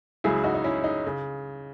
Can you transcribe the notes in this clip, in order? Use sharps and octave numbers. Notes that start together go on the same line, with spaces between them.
C#2 C#3 F#3 E4 G#4
D#4 F#4
D#4
C#4 E4
D#4
C#3